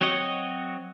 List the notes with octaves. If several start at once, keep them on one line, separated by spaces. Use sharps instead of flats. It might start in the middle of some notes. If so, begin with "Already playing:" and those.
F#3 C4 F#4 C#5 D#5